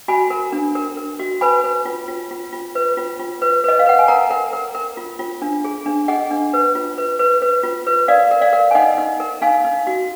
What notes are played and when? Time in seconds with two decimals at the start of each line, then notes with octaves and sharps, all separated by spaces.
0.08 F#4 G#5 B5
0.30 A#4
0.52 D4
0.75 A#4
0.97 A#4
1.19 F#4
1.41 B4 G#5 B5
1.64 B4
1.86 F4
2.08 F4
2.31 F4
2.53 F4
2.75 B4
2.97 F4
3.19 F4
3.42 B4
3.64 B4 D#5
3.79 F5
3.86 B4 F#5
3.99 G#5
4.08 A#4 F#5 A#5
4.31 A#4
4.53 A#4
4.75 A#4
4.97 F4
5.19 F4
5.42 D4
5.64 G#4
5.86 D4
6.08 G#4 D#5 F#5
6.31 D4
6.53 B4
6.75 F4
6.98 B4
7.19 B4
7.42 B4
7.63 F4
7.86 B4
8.08 A#4 D5 F5
8.31 A#4
8.41 D5 F5
8.53 A#4
8.71 G#5
8.75 D#4 D#5 F#5
8.98 D#4
9.20 A#4
9.42 D#4 F5 G#5
9.64 D#4
9.87 F#4